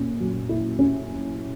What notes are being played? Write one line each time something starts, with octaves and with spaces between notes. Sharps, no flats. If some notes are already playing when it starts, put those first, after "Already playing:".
Already playing: A#2 C#4
F#3
E4
C#4